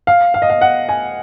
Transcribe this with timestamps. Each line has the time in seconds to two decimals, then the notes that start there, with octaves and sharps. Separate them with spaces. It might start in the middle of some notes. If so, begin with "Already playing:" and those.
0.07 F5
0.34 F5
0.42 D#5
0.50 F5
0.61 F#5
0.89 G#5